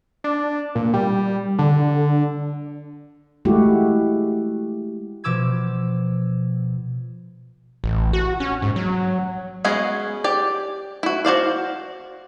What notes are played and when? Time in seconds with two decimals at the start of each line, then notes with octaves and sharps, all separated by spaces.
0.24 D4
0.75 A#2
0.94 G3
1.59 D3
3.45 G#3 A3 E4 F#4 G4
5.24 B2 F3 D6 E6 G#6
7.84 A1
8.13 F#4
8.40 C#4
8.62 G#2
8.76 F#3
9.65 G#3 B3 C#4 F#4 G#4
10.24 G4 D5
11.03 E4 F#4
11.25 F#4 C5 D5 F5